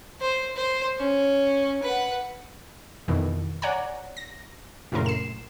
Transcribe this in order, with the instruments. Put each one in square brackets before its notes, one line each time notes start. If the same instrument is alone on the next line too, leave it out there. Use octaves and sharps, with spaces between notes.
[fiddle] C5
C5
C#4
B4 F#5
[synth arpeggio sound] F2 B2 D#3 E3
C#5 D5 F#5 G#5 A#5
A#6
A#1 F#2 A2 C#3 A#4 C6
C7 E7